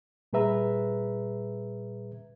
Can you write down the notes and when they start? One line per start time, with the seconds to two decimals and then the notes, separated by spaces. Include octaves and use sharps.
0.33 A#2 G3 G#4 B4 E5 A#5